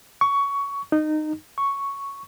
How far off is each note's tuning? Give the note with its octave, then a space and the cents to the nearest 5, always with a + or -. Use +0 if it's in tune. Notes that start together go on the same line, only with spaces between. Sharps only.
C#6 +15
D#4 -20
C#6 +0